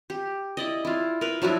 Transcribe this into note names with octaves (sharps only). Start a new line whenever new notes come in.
G4
E4 D5 D#5
E4 F4
A#4 B4
F3 F#3 D4 E4